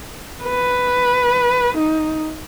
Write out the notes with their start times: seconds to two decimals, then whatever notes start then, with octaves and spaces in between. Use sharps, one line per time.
0.44 B4
1.77 D#4